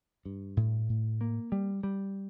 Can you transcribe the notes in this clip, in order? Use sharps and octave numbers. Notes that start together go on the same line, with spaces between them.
G2
A2
A2
A#3
G3
G3